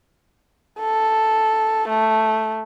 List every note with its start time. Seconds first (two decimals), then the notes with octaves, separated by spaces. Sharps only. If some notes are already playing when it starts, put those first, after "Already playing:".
0.80 A4
1.89 A3